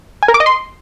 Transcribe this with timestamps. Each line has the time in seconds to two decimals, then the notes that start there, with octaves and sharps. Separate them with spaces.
0.23 G#5
0.28 A#4
0.34 D6
0.40 D#5
0.46 C6